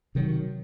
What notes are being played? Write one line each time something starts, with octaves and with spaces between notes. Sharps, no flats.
C3 D#3 F#3